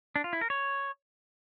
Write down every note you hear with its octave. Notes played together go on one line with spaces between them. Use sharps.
D4
F4
E4
A#4
C#5